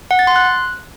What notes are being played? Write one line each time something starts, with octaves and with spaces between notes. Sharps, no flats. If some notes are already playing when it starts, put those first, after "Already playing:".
F#5
A6
C6
F#6